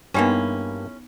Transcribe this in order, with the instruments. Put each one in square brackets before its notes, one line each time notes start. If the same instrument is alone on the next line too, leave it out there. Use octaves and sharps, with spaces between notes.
[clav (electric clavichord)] G2 A#3 [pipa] E3 G#3 C#4 [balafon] B3 D#4 G5